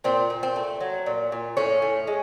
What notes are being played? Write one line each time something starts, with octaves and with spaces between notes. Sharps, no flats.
A#2 C4
A#2
C4
A3
F#3
A#2
A#2
A2 C#4
A2
G#3